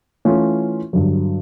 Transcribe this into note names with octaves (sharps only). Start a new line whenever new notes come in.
E3 A3 C#4 F4
G2 D3 F#3